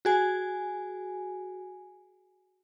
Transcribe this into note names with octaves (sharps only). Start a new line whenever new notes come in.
F#4 G#4 G#5